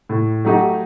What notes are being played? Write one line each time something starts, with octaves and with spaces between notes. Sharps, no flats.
A2
F#3 A3 D#4 G4